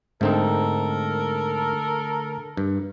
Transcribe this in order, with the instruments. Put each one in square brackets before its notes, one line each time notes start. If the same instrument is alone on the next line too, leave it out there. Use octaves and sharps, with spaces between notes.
[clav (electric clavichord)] G#2 C4 D#4 [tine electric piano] D3 A3 [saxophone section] A4 A#4
[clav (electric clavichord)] G2